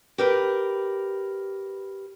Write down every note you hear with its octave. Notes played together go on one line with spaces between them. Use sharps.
G4 A#4 B4